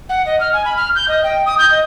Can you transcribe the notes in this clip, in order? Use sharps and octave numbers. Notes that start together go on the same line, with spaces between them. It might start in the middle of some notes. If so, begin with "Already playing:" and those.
F#5
D#5
F6
G#5
B5
F6
G6
D#5
G5
D#6
G6
D#5